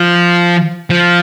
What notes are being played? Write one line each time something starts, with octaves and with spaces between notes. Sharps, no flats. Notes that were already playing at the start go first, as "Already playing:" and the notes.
Already playing: F3
F3